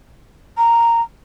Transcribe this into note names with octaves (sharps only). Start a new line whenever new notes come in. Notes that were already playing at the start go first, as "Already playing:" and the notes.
A#5